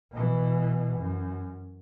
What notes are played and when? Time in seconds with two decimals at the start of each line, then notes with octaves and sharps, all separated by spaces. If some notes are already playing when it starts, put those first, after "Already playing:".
0.12 B2 E3
0.97 F#2